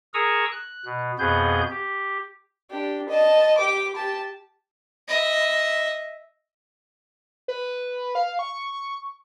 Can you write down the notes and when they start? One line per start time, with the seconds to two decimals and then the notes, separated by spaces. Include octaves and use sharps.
0.14 G#4 A#4 A#5 C#6 D#6 E6
0.52 F#6
0.85 B2
1.19 F2 B2 B3 G#4 G6
1.70 G4
2.71 D4 G4
3.09 D#5 A5
3.58 G4 D6
3.94 G4 A5
5.08 D#5 E5
7.48 B4
8.15 F5
8.39 C#6